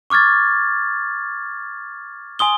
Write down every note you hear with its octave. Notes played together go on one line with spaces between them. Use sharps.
C#6 D6 F6 G#6 A6
G#5 C6 D#6 G7